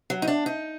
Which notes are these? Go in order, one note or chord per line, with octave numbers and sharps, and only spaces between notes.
F#3
D#4
D4
D#4